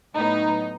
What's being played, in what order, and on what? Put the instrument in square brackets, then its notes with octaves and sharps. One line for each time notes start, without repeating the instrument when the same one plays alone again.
[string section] A2 F#3 B3 D#4